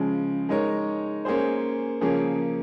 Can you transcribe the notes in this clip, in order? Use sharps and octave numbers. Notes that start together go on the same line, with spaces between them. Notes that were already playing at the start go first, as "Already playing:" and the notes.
Already playing: C#3 F3 G#3
G#3 D#4 A#4 C#5
A#3 C#4 G#4 C5
C#3 F3 A#3 C#4 G#4